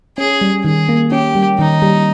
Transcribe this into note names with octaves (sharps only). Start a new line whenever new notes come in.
C#4 G#4
G3
D#3 G#4
A#3
C#4 G4
G3
D#3 D#4
G3